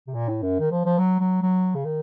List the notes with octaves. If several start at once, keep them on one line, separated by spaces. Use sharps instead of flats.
C3
A#2
A2
F#2
D#3
F3
F3
F#3
F#3
F#3
C#3
D#3